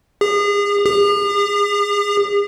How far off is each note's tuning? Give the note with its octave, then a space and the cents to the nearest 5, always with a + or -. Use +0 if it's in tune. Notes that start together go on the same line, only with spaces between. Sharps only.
G#4 -35
G#4 -45